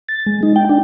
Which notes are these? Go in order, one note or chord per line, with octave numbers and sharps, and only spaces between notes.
A6
G#3
D#4
G5
D4